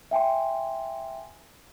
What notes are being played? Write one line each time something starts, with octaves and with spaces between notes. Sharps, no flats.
E5 G5 G#5 C6